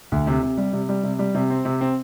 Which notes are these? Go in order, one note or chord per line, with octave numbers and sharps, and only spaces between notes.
D2
C3
C3
G3
C3
G3
C3
G3
C3
C4
C3
C4